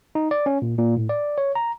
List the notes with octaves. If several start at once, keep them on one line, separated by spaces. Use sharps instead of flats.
D#4
D5
C#4
A#2
A#2
A2
D5
C#5
A#5